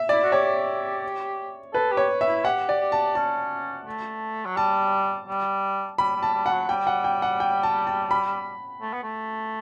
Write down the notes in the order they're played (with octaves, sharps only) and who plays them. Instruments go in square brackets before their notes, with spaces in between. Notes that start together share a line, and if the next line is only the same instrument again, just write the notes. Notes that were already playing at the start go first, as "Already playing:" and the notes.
Already playing: [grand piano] E5
[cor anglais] E4 [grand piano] D5
[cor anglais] F#4
[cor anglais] G4 [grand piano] C#5
[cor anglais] A4 [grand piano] B4
[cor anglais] G4
[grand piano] C#5
E5
[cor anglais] E4
[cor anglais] G4 [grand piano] F#5
[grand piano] D5
[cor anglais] G4
[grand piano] A5
[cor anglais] C#4 [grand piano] A5
[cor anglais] A3
F#3
[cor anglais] G3 [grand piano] A5
[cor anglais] G3
[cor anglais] G3 [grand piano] B5
[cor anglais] G3
[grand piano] A5
[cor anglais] G3
[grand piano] F#5
[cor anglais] F#3
[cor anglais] G3 [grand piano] G5
[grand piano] F#5
G5
F#5
G5
A5
A5
B5
[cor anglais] A3
B3
A3